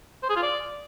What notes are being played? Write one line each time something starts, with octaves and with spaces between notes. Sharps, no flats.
C5
G#4
F4
D5